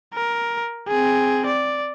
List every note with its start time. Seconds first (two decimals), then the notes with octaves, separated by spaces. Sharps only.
0.14 A#4
0.88 C4 G#4
1.46 D5